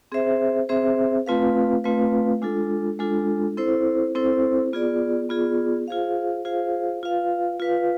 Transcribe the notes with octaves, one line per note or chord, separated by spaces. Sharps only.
C4 G#4 C5 E5
C4 G#4 C5 E5
A3 C4 F4 B4 F5
A3 C4 F4 B4 F5
G#3 D4 F4 A4
G#3 D4 F4 A4
C4 E4 A4 C5
C4 E4 A4 C5
B3 F4 G#4 D5
B3 F4 G#4 D5
F4 G#4 C5 F5
F4 G#4 C5 F5
F4 B4 F5
F4 B4 F5